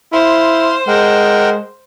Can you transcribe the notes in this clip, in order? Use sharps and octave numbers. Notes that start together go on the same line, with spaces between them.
E4 C5 F5 C6
G#3 A#4 F#5 G5